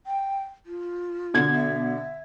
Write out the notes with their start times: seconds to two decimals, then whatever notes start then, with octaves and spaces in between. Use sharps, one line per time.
0.07 G5
0.66 F4
1.34 B2 D3 G#6
1.53 E5